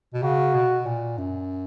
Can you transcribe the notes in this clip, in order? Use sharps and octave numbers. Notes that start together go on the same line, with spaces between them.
B2
C#3 F#4
B2
A#2
F#2